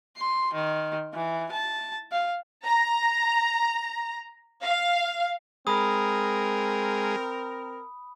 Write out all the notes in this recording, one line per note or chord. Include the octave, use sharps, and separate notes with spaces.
C6
D#3
E3
A5
F5
A#5
F5
G#3 C4 G#4 A#4 B5 D#6